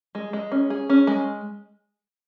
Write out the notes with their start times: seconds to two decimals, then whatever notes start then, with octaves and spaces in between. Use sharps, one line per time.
0.15 G#3
0.33 G#3
0.52 C#4
0.70 G#4
0.89 C#4
1.07 G#3